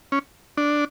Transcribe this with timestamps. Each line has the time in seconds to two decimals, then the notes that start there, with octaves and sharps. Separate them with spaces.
0.12 C#4
0.57 D4